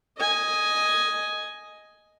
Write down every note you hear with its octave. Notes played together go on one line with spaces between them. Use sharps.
D#5 G#5